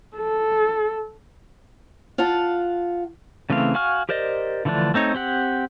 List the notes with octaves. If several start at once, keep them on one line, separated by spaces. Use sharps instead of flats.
A4
F4 F5 F#5 A5
C#3 E3 A3 C4 F5
F#4 F5 G#5 C#6 F6
G4 A#4 C5 D5 D#5
D3 E3 F3 A3 D4
A3 C4 D#4 C#5
C4 G4 F#5